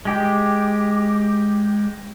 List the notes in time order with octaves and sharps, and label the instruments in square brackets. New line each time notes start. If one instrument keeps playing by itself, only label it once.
[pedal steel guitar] G#3 G4